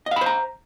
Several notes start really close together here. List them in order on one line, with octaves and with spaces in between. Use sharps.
D#5 F5 B5 C5 A#5